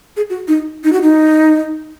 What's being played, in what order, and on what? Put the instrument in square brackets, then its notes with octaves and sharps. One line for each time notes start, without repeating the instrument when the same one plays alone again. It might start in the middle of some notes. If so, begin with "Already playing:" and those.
[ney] G#4
F#4
D#4
D#4
F#4
D#4